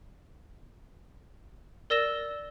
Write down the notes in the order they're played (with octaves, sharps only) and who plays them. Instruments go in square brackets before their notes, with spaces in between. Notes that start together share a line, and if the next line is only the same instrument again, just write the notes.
[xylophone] A#4 D5 E6 A#6 E7 G7